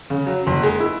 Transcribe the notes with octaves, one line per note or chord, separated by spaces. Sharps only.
C#3
F#3
F#1
G#3
E4